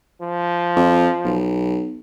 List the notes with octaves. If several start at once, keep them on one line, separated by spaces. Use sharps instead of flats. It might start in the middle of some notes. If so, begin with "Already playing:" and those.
F3
F2
B1